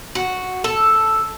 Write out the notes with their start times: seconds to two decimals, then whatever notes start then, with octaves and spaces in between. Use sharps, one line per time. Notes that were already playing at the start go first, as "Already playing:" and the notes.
0.15 F#4
0.64 A4